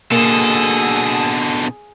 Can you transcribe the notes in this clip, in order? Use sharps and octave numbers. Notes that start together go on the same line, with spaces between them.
B2 D3 A#3 G#4 A4 D#6